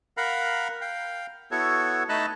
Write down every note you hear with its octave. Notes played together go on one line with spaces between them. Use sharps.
A#4 F5 F#5 A#5 B5
F5 G5
B3 E4 F#4 A4 C#5
A3 D#4 D#5 A5 B5 F#6